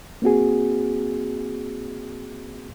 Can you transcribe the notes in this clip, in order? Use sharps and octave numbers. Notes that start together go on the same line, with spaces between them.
A#3 C4 F#4 G#4